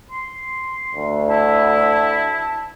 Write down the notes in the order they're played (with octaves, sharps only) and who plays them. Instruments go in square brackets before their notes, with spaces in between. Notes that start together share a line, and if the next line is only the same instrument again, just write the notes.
[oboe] C6
[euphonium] D2
[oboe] E4 [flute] A5